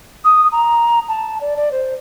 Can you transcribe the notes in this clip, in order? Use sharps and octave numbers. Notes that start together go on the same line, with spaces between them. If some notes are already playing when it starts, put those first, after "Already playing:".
D#6
A#5
A5
D5
D5
C5